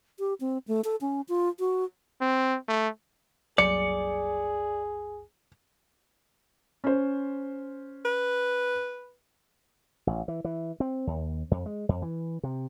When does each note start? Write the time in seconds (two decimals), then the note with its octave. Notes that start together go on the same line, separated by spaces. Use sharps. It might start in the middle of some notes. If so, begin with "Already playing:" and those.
0.19 G4
0.41 C4
0.68 A3
0.84 A4
1.01 C#4
1.29 F4
1.59 F#4
2.21 C4
2.68 A3
3.58 F#1 C2 F#3 G#4 D5 C#7
6.84 C#4 C5
8.05 B4
10.07 A1
10.28 E3
10.44 E3
10.80 C4
11.07 D#2
11.51 F2
11.66 G#3
11.89 F2
12.02 E3
12.43 C3